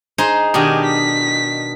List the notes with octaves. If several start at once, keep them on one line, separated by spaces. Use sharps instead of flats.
D#4 G#4 C5
B2 D#3 D4 G4 G#5
B6